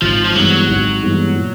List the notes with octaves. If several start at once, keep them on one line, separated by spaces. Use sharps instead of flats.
G#1 F3
F3
G2 E3 F#3 G#3 B3
G#1
G2 E3 G#3 B3
A#2